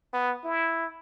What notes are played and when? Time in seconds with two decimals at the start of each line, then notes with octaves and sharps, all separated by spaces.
0.14 B3
0.45 E4